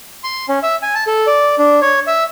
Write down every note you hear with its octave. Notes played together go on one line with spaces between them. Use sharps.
C6
C#4
E5
G#5
A5
A4
D5
D4
C#5
E5